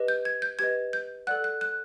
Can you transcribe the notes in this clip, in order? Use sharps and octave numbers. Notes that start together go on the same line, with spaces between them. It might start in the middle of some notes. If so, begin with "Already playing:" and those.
Already playing: G4 B4 D#5
G6
G#6
G6
G4 B4 D#5 G#6
G6
A4 D5 F#5 F#6
F#6
F#6